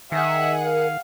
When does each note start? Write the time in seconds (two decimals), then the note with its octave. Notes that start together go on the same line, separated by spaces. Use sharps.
0.12 D#3 G#4 E5 F#5
0.64 A#4 F5